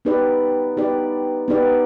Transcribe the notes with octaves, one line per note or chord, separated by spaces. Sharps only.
B3 D#4 G4 B4 D5
B3 D#4 G4 B4 D5
B3 D#4 G4 B4 D5